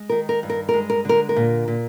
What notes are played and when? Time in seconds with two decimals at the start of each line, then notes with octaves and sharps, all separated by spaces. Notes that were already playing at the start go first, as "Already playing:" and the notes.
Already playing: G#3
0.09 D#3 A#4
0.29 A#4
0.43 G2
0.50 A#4
0.69 G#3 A#4
0.90 A#4
1.05 D3 A#4
1.29 A#4
1.36 A#2
1.68 A#2